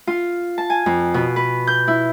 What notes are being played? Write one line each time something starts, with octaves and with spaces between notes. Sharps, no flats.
F4
A5
G#5
F2
B2
B4
G6
E4